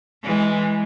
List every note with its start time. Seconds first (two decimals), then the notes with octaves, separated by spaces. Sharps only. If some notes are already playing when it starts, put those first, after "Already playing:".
0.23 E3 G#3